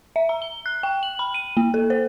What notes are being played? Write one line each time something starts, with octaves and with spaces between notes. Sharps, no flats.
E5
A#5
G7
F#6
G5
F#7
B5
D#7
A#3
A4
C5